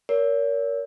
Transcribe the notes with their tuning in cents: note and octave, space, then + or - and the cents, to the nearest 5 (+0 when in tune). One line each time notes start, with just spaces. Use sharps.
A#4 +0 C#5 +35